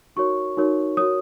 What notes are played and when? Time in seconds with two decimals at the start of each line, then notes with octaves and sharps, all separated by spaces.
0.16 D#4 F#4 A#4 C#5 C#6
0.57 D#4 F#4 A#4 C#5
0.97 F#4 A#4 C#5 D#6